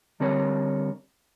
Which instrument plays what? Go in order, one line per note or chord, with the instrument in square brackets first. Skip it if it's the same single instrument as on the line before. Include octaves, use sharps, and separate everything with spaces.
[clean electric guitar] D3 G3 C4 A#4 C#5